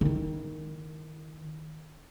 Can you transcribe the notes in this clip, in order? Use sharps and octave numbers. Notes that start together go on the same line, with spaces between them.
D#3 E4